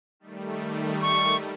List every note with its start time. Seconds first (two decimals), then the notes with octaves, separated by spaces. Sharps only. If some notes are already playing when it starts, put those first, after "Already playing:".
0.20 D#3 G3 A3
1.02 C#6